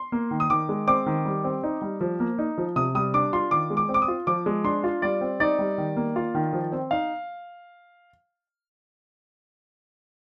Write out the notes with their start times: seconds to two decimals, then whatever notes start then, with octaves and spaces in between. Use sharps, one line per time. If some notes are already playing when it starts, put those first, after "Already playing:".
Already playing: C6
0.12 A#3
0.31 D#3
0.40 D#6
0.50 D#3 D6
0.69 G#3
0.87 C4 D6
1.06 D#3
1.25 G3
1.44 C4
1.63 D#4
1.82 G3
2.01 F3
2.20 A#3
2.38 D#4
2.58 F3
2.76 C3 D#6
2.95 G3 D#6
3.14 D4 D6
3.33 F4 C6
3.51 D#3 D6
3.70 G#3
3.77 D6
3.89 C4
3.94 D6
4.02 D#6
4.08 F4
4.27 F3 D6
4.46 G#3
4.64 D4 C6
4.84 F4
5.02 G3 D5
5.21 C4
5.40 D#4 D5
5.59 G3
5.78 D#3
5.97 A#3
6.16 F4
6.35 D#3
6.53 F3
6.72 C4
6.91 D#4 F5